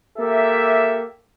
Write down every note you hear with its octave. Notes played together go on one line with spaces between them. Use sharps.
A#3 G4 A4 E5